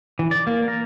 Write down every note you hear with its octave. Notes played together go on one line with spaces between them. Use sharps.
E3
D5
A#3
A#4